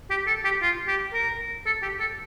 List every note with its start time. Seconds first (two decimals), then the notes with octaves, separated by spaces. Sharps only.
0.10 G4
0.27 A4
0.44 G4
0.62 F4
0.87 G4
1.14 A#4
1.66 A4
1.82 G4
2.00 A4